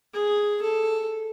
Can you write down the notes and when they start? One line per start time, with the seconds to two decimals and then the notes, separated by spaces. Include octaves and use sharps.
0.14 G#4
0.62 A4